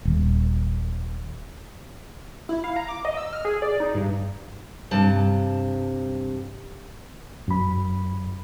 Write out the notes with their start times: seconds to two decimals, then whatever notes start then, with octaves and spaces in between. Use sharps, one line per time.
0.05 D#1
2.49 E4
2.64 F5
2.76 A#5
2.89 D6
3.05 D#5
3.17 E6
3.33 F6
3.45 G#4
3.62 D5
3.80 D#4
3.94 G2
4.91 G2 C3 A5
7.48 F#2 B5